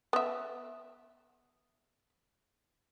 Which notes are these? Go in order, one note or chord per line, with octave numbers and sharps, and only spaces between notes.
B3 E5